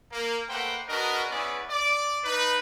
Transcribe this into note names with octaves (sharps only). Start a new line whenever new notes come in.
A#3
A3 A#3 B4 C5 F#5 G5
D4 F#4 G#4 A#4 B4 D#5
B3 C#4 E4 G#4 B4 D5
D5 D6
D#4 B4